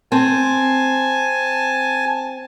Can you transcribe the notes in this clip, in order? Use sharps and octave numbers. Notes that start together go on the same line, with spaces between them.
C4 G#5 A5